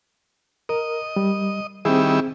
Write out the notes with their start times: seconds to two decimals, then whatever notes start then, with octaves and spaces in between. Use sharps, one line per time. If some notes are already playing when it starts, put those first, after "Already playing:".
0.69 A#4 D#5
1.16 G3
1.85 D#3 G3 C4 E4 G#4